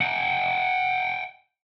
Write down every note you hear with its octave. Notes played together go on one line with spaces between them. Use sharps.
F#5 G5